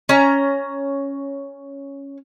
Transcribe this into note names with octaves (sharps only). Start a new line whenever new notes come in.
C#4 A#5